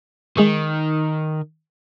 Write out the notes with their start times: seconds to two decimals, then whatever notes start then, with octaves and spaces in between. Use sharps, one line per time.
0.37 D#3 G#3 G#4 C#6